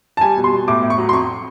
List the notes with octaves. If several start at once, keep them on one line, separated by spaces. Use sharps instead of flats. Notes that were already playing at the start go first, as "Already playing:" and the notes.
A5
G3 G#5
B2
C6
B2
A2 D6
A2
C#6
F#3
C6
F2 C#6